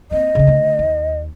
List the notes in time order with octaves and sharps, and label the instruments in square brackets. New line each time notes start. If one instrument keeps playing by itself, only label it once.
[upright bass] A#3 C4 [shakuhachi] D#5
[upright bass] C#3 C#4
D3 A3
D#2